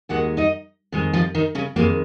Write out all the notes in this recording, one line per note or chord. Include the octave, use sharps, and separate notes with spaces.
D#2 D#3 G#3 F#4 F#5
D#4 D#5
F2 D#3 G#3
F3 F4
D#3 D#4
C#3 C#4
F2 D#3 G#3 A#3